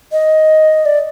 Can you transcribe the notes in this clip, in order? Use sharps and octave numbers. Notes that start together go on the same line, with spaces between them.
D#5
D5